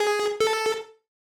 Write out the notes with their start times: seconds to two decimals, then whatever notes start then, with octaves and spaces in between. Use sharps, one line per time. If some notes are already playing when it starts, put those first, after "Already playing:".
Already playing: G#4
0.40 A4